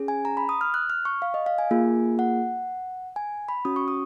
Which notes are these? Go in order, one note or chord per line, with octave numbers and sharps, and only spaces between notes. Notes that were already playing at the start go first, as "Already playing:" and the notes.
Already playing: C#4 G#4
G#5
A#5
B5
D#6
F6
F#6
F6
C#6
F5
D#5
F5
G#5
A#3 F4 G#4
F#5
G#5
B5
C#4 F#4 D#6
C#6
D#6